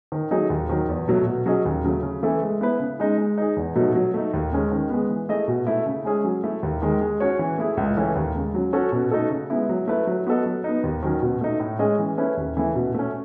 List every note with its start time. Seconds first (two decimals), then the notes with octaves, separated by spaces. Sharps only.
0.12 D#3
0.31 F#3 A3 D#4 G#4
0.50 D#2
0.70 D#3 F#3
0.89 E2
1.08 B2 F#3 A3
1.26 B2
1.46 F#3 C#4 G#4 D#5
1.65 D#2
1.84 C#3 F#3 A3
2.03 C#3
2.23 E3 A3 E4 A4
2.42 G#3
2.61 B3 E4 B4
2.80 C#3
3.00 G#3 D#4
3.18 G#3
3.38 D#4 G#4
3.57 E2
3.75 B2 F#3 A3 D#4
3.95 F#3
4.14 A3 D#4
4.33 D#2
4.52 C#3 G#3 C#4
4.72 D#3
4.90 G#3 B3
5.09 E3
5.29 A3 E4 G#4 D#5
5.48 B2
5.67 A3 E4
5.86 C#3
6.05 G#3 C#4 G#4
6.25 F#3
6.43 A3 E4
6.63 D#2
6.82 D#3 G#3
7.01 G#3
7.20 C#4 F#4 C#5
7.39 E3
7.58 A3 E4 G#4
7.77 C#2
7.97 C#3 E3 A3 C#4
8.15 D#2
8.35 C#3 G#3
8.55 F#3
8.73 C#4 F#4 A4
8.92 B2
9.11 A3 D#4 F#4 A4
9.30 C#3
9.50 G#3 B3 E4
9.69 F#3
9.88 A3 E4 B4
10.07 F#3
10.27 B3 F#4 A4 D#5
10.46 F#3
10.64 B3 D#4
10.84 D#2
11.03 D#3 F#3 C#4
11.22 B2
11.41 A3 D#4
11.60 A2
11.79 G#3 C#4 G#4 D#5
11.99 E3
12.17 A3 C#4 E4 B4
12.37 D#2
12.56 C#3 E3 A3 E4
12.75 B2
12.94 A3 C#4